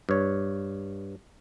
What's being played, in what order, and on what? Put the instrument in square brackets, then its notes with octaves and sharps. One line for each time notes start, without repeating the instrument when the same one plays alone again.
[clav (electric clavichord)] G2 C#5